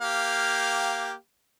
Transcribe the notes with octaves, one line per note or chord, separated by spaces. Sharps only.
A#3 G4 F5